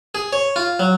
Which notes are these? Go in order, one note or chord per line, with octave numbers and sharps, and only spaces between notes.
G#4
C#5
F4
F#3